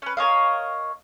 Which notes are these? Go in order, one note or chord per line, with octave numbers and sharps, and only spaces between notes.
C#4 B4
A#4 C#5 D#5 F5